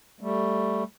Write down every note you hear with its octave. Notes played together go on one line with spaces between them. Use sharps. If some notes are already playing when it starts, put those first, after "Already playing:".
G3 A3